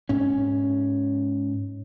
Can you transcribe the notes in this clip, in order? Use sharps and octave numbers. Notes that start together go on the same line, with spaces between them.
G#2 C#4